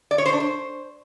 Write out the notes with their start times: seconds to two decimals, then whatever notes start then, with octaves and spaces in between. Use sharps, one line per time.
0.11 D5
0.18 C#5
0.26 C5
0.33 D4
0.40 C5